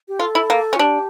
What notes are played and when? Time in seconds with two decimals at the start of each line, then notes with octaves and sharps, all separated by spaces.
0.08 G4
0.19 F4 A4
0.35 E4
0.50 A#3
0.73 C#4
0.76 F4
0.79 D4 G4